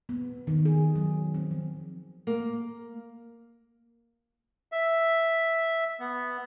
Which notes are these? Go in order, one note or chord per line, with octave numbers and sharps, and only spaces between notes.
B3
D#3
G#4
F#3
C4
F3
A#3
E5
B3